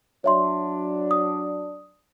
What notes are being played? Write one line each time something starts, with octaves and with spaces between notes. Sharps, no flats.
F#3 D4 C#5 E5 C6
D#6